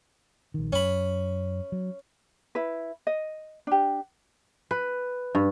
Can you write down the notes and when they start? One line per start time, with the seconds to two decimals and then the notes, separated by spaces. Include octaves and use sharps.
0.54 A#1 D#3
0.73 F#2 C#4 B5
1.72 F#3
2.55 E4 B4
3.07 D#5
3.67 D4 G4
4.71 B4
5.35 G2